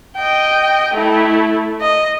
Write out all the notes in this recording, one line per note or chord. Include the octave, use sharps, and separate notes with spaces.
D#5 G5
A3 E4
D#5